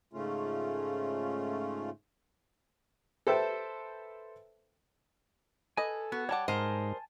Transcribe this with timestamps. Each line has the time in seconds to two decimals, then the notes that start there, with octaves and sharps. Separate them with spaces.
0.13 G#2 C#3 A3 C#4 F4
3.27 A4 B4 C5 E5 G5 A5
5.77 A4 B4 D#5 G#5
6.12 B3 F#4
6.29 G3 C#5 F#5 A5 D6
6.48 G#2 A#4 C5 D#5 G#5 A5